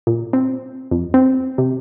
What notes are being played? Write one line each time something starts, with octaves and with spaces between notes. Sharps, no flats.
A#2
C4
F2
C4
C3